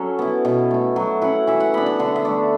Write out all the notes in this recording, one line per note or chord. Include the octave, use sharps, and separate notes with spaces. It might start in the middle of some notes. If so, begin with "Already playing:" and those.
Already playing: F#3 C#4 A4
B3 E4
B2
A3 E4
F#3
C#4 E4 F#5
E3 E5
F#5
B3 D4 B5
A5
D3 F#5
E5
A3 D4 D5